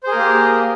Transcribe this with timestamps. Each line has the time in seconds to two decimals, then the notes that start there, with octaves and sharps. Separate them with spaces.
0.03 C5
0.07 G#4
0.11 A#4
0.15 A#3
0.19 G4